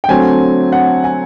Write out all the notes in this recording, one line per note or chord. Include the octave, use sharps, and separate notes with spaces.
G5
D3 F#3 A3 C4 G#5
F#5
G#5